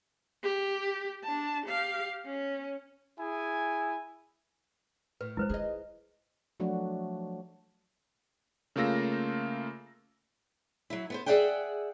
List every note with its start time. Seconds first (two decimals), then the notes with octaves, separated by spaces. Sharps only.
0.44 G4
1.24 D4 A5
1.66 G4 F5
2.26 C#4
3.18 E4 G#4 G#5
5.21 A2 B4
5.37 D#3 G#3 E4 B4 C5
5.49 D#4 F4 G#4 D#5
6.60 F3 F#3 A3 D4 F#4
8.76 C#3 A3 A#3 F4 E6 A#6
10.90 F#3 E4
11.10 B3 B4 C5
11.26 G#4 A#4 D5 E5 F#5 G5